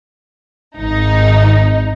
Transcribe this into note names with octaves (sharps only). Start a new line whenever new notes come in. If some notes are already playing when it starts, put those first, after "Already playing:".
G#1 D#4